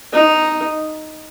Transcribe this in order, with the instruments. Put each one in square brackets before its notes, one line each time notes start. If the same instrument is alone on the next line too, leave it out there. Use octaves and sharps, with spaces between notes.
[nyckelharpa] D#4